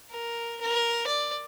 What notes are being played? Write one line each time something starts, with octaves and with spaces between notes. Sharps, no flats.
A#4
A#4
D5